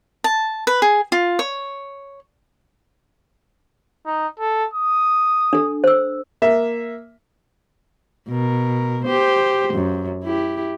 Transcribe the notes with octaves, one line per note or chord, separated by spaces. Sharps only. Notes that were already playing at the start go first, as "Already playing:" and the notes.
A5
B4
G#4
F4
C#5
D#4
A4
D#6
D4 A4
C5 E6
A#3 E5
B2 A#4
G4 C5
F#2
E4 G4